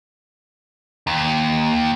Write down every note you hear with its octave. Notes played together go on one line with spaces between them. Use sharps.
D#2